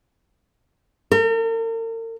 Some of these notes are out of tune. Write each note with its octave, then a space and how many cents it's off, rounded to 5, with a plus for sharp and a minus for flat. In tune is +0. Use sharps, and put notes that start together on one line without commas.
A#4 -45